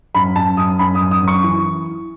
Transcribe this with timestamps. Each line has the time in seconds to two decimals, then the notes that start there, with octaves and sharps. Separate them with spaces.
0.15 F#2 B5
0.36 F#2 A5
0.57 F#2 D#6
0.79 F#2 B5
0.95 D#6
1.01 F#2
1.11 D#6
1.22 F#2
1.28 C#6
1.44 E3